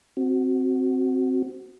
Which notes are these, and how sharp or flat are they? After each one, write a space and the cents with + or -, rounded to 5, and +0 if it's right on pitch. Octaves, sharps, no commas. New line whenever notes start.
C4 +0 F#4 +0